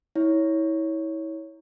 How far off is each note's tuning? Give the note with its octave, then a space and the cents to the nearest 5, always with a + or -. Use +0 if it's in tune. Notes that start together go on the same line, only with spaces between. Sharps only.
E4 -30 C#5 +0